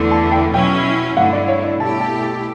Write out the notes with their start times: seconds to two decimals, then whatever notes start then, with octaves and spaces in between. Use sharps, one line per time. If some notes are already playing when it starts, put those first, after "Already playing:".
Already playing: E2 D3 A3 E4
0.11 A5
0.32 G5
0.54 B2 F#3 C#4 E4 G5
1.17 G2 D3 A3 E4 F#5
1.33 D5
1.48 C#5
1.64 D5
1.80 B2 A3 E4 G4 A5
2.01 A5
2.23 A5